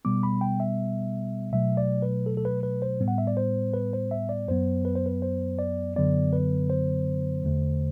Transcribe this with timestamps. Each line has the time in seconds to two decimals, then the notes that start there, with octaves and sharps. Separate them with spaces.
0.05 B2 G3 B3 D6
0.23 B5
0.41 G5
0.60 E5
1.53 B2 F#3 A3 E5
1.77 D5
2.02 B4
2.26 A4
2.37 A4
2.45 B4
2.63 B4
2.82 C5
3.00 A2 G3 B3
3.08 F#5
3.18 E5
3.27 D5
3.37 C5
3.74 B4
3.93 C5
4.11 E5
4.29 D5
4.48 F#2 F#3 B3 C5
4.85 B4
4.95 C5
5.06 B4
5.22 C5
5.59 D5
5.96 F#2 D3 F#3 B3 D5
6.33 B4
6.70 C5
7.44 E2 D3 A3